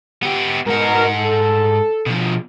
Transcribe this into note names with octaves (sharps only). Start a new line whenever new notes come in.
B3 G4
G#2 B2 A#4 F#5
A4
B2 F3